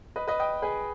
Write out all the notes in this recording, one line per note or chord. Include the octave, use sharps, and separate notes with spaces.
B4 D#5
B4 D#5
D#5 G5
G#4 B4